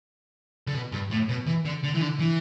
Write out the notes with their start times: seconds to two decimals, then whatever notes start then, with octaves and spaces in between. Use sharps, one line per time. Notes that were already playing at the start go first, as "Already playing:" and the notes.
0.67 D3
0.74 B2
0.92 G2
1.11 A2
1.29 B2
1.47 E3
1.65 D3
1.84 D3
1.95 E3
2.01 D3
2.19 E3